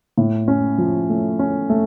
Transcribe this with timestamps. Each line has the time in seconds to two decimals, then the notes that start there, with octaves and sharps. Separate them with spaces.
0.18 A2
0.48 C#4
0.78 F3
1.10 A3
1.39 C#4
1.70 A3